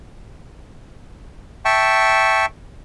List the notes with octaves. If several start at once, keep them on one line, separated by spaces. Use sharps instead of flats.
E5 G5 A5 C#6